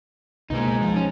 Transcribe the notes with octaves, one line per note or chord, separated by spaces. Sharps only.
C#2 B2 G#3 A#3 D#4
F3
C#4